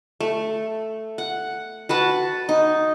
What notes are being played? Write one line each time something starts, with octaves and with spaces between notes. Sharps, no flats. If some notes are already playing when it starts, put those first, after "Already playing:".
A3
F#5
F#4 B4 A5
D#4